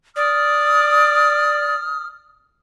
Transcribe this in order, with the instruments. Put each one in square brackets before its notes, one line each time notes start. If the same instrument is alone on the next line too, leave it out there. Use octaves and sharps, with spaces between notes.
[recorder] D5 [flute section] D#6 F6